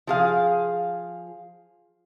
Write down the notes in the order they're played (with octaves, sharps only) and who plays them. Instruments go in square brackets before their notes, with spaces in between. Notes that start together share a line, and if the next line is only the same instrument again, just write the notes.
[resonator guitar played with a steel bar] F3 G#4 F5